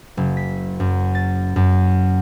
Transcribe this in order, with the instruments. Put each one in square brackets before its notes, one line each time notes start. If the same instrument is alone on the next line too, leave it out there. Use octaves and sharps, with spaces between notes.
[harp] F#1
B6
F#2
A6
F#2